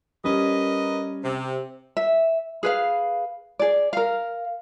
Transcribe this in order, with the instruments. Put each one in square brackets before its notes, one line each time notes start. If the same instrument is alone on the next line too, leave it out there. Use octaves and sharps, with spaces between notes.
[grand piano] G3 C#4 [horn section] A#4 B4 D#5
[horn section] C3
[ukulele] E5
G#4 B4 F5
G#4 D5
A#4 F5